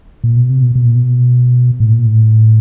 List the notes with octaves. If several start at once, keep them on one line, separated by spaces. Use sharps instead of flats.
A#2
B2
C3
B2
B2
A#2
B2
A2
A#2
A2